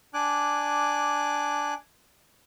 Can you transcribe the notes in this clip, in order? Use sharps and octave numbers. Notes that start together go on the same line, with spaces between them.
D4 G#5 D6 F#6